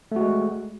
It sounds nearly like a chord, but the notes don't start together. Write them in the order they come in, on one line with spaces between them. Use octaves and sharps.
A3 F#4 G#3